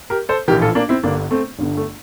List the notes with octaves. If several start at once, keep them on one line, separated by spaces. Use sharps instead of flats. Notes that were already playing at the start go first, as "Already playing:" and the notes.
G4 A#4
A4 C5
A#1 A2 E3 G4 A#4
F4 A4
A#3 D4
C4 E4
G1 G2 D3 A#3 D4
A3 C4
G1 G2 D3
A3